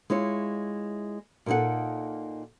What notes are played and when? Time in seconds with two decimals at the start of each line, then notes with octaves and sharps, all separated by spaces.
0.10 G#3 E4 F4 C#5
1.46 A#2 A#3 D#4 A4 F#5